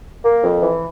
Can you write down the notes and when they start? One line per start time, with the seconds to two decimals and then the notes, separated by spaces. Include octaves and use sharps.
0.24 A#3
0.43 F2
0.61 E3